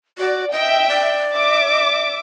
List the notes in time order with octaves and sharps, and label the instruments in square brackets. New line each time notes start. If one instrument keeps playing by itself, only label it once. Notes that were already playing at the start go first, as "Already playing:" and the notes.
[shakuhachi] F#4 [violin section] D5
[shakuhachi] D#5 [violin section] E5 G5
[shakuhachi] D5
[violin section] E5 D6